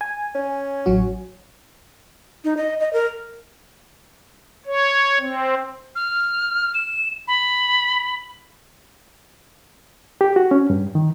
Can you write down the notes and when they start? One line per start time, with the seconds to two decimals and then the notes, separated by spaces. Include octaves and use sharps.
0.01 G#5
0.35 C#4
0.86 A1 F#3 F#4
2.44 D#4
2.57 D#5
2.80 D#5
2.93 A#4
4.66 C#5
5.20 C4
5.96 F6
6.75 E7
7.28 B5
10.21 G4
10.36 F#4
10.51 C#4
10.70 G2
10.95 D#3